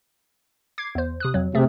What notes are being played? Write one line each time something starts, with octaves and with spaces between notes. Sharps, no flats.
D6 G#6 C7
E2 C5
C3 D#6 F#6
F2 F#3
C3 A3 G#4